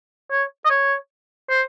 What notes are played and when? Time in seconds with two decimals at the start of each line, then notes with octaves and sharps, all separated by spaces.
0.31 C#5
0.65 D#5
0.70 C#5
1.49 C5